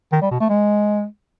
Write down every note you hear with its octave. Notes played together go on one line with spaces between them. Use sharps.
D#3
G3
B2
A3
G#3